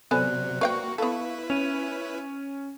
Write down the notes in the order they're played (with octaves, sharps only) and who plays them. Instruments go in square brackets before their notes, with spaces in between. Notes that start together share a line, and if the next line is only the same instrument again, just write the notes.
[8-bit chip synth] C3 F#3 [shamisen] B3 A4 G#5 [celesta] C5 D5 F#6
[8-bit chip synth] A#3 F#4 [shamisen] B4 F5 G5 [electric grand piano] C#6
[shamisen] B3 A4 [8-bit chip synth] E4 B4 [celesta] F5
[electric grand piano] C#4 [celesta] D#7 F7